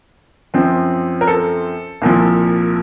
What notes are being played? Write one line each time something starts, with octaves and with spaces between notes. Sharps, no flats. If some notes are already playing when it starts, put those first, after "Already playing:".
F#2 F3 C4
A#4
A4
C2 A#2 F3